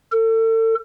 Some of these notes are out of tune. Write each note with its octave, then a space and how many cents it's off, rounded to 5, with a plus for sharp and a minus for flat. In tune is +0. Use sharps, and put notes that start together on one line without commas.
A4 +35